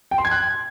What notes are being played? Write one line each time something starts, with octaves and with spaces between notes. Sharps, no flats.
G5
C6
G#6
F#6